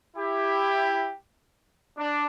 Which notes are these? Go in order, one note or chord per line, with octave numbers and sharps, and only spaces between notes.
E4 G4
D4